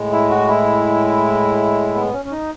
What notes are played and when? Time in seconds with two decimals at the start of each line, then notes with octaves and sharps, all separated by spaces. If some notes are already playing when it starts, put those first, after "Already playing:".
Already playing: A2 G#3
0.12 E4
0.30 F#4
0.49 E4
1.95 B3
2.13 C#4
2.25 C#4
2.31 D#4